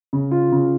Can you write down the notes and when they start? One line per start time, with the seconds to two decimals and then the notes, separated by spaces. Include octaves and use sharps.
0.13 C#3
0.31 F4
0.52 C#3